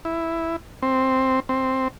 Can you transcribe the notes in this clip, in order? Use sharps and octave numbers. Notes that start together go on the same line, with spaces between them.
E4
C4
C4